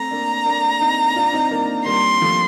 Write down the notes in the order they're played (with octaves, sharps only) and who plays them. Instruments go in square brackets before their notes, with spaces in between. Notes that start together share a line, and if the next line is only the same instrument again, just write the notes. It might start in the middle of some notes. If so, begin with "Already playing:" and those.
Already playing: [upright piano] A3 C4 [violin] A#5
[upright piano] A#3 D4
A#3 D4
C4 D#4
D4 F4
C4 D#4
A#3 D4
[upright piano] G3 A#3 [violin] C6
[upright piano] F3 A3